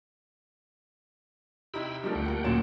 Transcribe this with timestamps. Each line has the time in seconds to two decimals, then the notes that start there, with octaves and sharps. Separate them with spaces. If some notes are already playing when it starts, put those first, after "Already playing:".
1.74 C3 D#4 E4 G5 B5 E6
2.03 F3 G3 A3 D4 A#4
2.15 D2 F#5 G5
2.28 A#3
2.44 F#2 A#2 F#3 E7